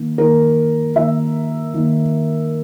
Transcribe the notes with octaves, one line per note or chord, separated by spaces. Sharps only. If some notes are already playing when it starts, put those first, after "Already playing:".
Already playing: D#3 A#3
D#3 A#3 A#4
D#3 A#3 E5
D#3 A#3